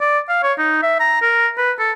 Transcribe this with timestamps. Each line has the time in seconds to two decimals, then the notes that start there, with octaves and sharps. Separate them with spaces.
0.01 D5
0.29 F5
0.43 C#5
0.58 D#4
0.83 E5
1.00 A#5
1.22 A#4
1.58 B4
1.79 A4